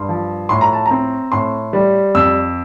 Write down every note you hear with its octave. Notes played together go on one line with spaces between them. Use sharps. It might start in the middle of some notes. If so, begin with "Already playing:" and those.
Already playing: G2 C6
F3
A2 C6
A#5
A5
A#5
C4
A2 C6
G3
F2 E6